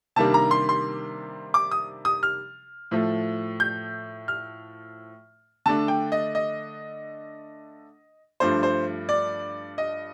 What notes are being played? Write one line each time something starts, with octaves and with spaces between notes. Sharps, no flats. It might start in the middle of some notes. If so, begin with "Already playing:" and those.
C3 D#3 G3 A#3 D4 A5
A#5
C6
C6
D6
D#6
D#6
F6
A2 F3 A3
G6
F6
D3 A3 D4 A5
G5
D#5
D#5
G2 F3 A3 D4 C5
C5
D5
D#5